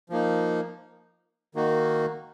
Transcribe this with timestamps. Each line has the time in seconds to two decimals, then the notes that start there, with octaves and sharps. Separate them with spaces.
0.10 F3 A#3 D#4
1.55 D#3 A#3 D#4 F#4